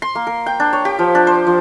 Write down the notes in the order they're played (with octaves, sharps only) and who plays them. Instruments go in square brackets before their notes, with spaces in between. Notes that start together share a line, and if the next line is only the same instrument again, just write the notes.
[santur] C6
A#3
A#4
G5
D4
C#5
G4
F3
D4
C5
F3